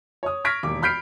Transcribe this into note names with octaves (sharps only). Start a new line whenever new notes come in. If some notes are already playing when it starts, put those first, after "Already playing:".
C#5 D#6
C#6 F6 G#6 A#6 B6 D7
E1 D#2 D6
B5 F6 G6 B6 C7 D7